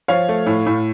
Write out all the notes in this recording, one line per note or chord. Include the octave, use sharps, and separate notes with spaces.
F3 C#5 F5
A3
A2
A2